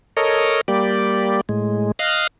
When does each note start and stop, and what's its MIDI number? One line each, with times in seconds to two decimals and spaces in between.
0.17 0.61 69
0.17 0.61 70
0.17 0.61 73
0.17 0.61 75
0.68 1.41 55
0.68 1.41 58
0.68 1.41 67
0.68 1.41 74
1.49 1.92 45
1.49 1.92 56
1.99 2.27 75
1.99 2.27 77
1.99 2.27 89
1.99 2.27 90